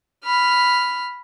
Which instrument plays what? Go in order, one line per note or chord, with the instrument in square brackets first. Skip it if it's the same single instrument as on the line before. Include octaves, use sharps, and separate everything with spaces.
[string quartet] B5 F6